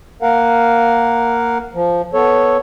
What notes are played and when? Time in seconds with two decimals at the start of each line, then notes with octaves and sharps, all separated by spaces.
0.22 A#3 A#4 F5 F#5
1.74 F3
2.14 B3 A4 C#5